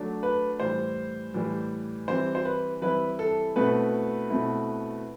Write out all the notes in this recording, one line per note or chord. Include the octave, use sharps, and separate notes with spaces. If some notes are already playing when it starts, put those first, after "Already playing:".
Already playing: F#3 A3 D4
B4
A2 E3 G3 C5
A2 E3 G3
E3 G3 C4 E4 C5
C5
B4
E3 G3 C4 E4 B4
A4
B2 A3 C4 E4 B4
B2 A3 C4 E4